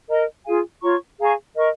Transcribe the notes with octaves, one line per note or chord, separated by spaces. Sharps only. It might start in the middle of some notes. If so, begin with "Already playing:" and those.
A#4 D#5 A#5
F4 G#4 F5 G#5
F4 C#5 A#5 C#6
G#4 F5 A#5 C#6
A#4 D#5 C#6